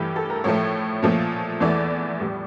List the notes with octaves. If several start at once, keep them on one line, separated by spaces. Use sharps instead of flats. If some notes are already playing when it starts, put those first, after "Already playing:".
Already playing: G2 E3 A3 G4
A4
A#4
A2 F3 A3 C#5
A#2 F3 A3
E2 E3 A3 D5
A2 G3